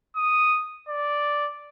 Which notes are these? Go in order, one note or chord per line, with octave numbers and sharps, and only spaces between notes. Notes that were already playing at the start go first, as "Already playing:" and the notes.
D#6
D5